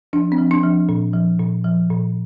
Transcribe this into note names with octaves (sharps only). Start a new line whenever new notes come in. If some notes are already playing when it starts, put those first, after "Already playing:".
F3 D4
C4
F3
D4
F3
A#2
F3
A#2
F3
A#2